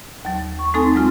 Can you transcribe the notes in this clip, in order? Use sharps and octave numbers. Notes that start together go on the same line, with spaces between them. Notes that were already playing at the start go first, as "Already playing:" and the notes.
D#2 F#3
C#6
A3 C4 D#4 A4 G#5
F#3 G#3 C4 F4